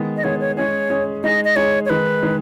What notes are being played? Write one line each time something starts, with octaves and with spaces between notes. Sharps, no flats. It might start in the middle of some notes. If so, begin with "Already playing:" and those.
Already playing: D#3 G#3 B3
D#5
D#3 G#3 B3 C#5
C#5
G#3 C#4 G#4 C#5
G#3 C#4 G#4
G#3 D#4 G#4 D#5
D#5
G#3 D#4 G#4 C#5
C#5
D#3 G#3 D#4 B4
D#3 G#3 D#4